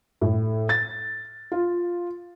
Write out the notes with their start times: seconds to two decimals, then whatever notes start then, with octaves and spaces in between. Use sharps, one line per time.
0.21 A2
0.69 A6
1.52 F4